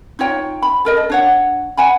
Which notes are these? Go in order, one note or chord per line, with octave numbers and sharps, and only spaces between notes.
D#4 F4 C#5 G5
B5
A4 A#4 D#5
A4
D4 C#5 F#5
F#5 G#5 B5